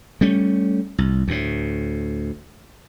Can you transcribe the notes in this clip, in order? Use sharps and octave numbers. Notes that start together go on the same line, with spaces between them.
G3 A3 C#4
C2
D2 A2